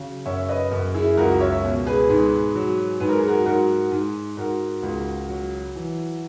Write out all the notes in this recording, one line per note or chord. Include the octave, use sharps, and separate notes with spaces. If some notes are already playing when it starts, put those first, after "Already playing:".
Already playing: C#3 F#3
F#2 C#5 E5
B4 D#5
F#2
E4 G#4
C#2 F#4 A#4
C#5 E5
B2
G#4 B4
G#2
F#3
G#2 B4
A#4
G#4
F#4 A#4
G#2 F#4 A#4
G#2
G#2 F#4 A#4
C#2
F#3
E3